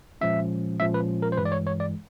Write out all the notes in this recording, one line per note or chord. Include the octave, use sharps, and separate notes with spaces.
A#2 F3 G#3 C#4 E5
A#2 F3 G#3 C#4 E5
B4
A#4
C5
G2 E3 G#3 B4
D5
C#5
C#5
D5